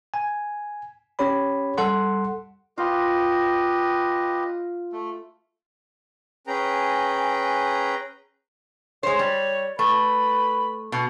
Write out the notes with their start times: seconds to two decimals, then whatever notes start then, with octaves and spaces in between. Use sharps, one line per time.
0.14 G#5
1.19 C#4 G4 C#5 B5
1.78 G3 A4 F#5 C6
2.78 F4 G4 B4 D#5
4.92 A3
6.47 C#4 G#4 B4 G5 A#5
9.03 G#3 C5 C#5
9.19 G3
9.79 A3 B4
10.92 B2